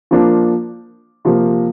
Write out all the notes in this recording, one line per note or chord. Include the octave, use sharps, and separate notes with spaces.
F3 A#3 D4 F4
C3 F3 A#3